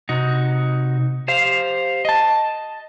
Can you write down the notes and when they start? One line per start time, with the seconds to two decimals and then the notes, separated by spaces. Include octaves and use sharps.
0.09 C3 D#4 F#4
1.28 G4 C5 F5
2.05 D#5 A5